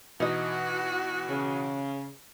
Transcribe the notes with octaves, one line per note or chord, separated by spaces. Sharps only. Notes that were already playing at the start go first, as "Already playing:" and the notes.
B2 E3 D#4 F#4 D#5
C#3